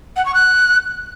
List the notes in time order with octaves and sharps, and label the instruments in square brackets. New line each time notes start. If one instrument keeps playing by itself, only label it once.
[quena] F#5
C#6
F#6